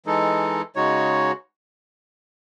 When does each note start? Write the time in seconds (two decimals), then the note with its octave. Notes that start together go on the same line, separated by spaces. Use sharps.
0.06 E3 G#3 D#4 A4
0.76 C#3 G#3 D#4 F#4 C#5